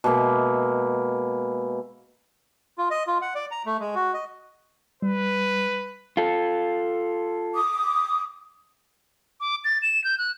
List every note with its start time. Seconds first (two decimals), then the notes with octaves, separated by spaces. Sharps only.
0.04 B2 G#3 A#3 E5
2.78 F4
2.91 D#5
3.07 F4
3.22 F#5
3.35 D5
3.51 A#5
3.66 A3
3.80 G#3
3.95 F#4
4.14 D#5
5.02 G3 B4
6.17 F4 A4
7.54 D6 D#6
9.40 D6
9.65 A6
9.82 E7
10.04 G6
10.18 F#6